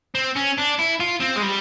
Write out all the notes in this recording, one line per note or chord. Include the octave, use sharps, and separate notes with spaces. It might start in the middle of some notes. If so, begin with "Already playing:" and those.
C4
C#4
D4
E4
F4
C4
G#3
G3